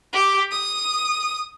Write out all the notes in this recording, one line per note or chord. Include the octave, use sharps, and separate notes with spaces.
G4
D#6